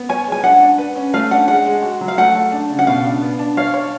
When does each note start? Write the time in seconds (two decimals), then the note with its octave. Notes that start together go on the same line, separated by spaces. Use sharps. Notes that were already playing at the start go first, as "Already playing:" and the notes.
Already playing: B3
0.09 C#5 G#5
0.27 G#3
0.32 G#5
0.44 D4 F#5
0.61 D4
0.78 B4
0.96 C#4
1.14 A3 F5
1.31 D4 F#5
1.48 G#3 F#5
1.66 G#3
1.82 F#4
2.01 F#3
2.08 F5
2.18 A3 F#5
2.35 A3
2.52 D4
2.70 C#3
2.79 F#5
2.87 B2 F5
3.05 D4
3.22 B3
3.39 D4
3.57 C#5 F5
3.74 C#5